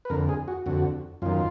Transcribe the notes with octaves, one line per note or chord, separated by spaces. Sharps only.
B4
F2 D3 A#4
G#4
F#4
F2 D3 F#4
F#2 D#3 F4